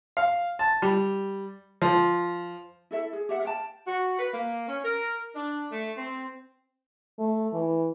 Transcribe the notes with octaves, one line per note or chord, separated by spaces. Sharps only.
F5
A5
G3
F3
E4 A4 E5
G#4
G4 E5 F#5
F5 G5 A5
F#4
B4
A#3
C#4
A#4
D4
A3
C4
A3
E3